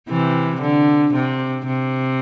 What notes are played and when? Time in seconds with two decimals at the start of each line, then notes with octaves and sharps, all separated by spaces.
0.08 C3 E3
0.61 D3
1.14 C3
1.66 C3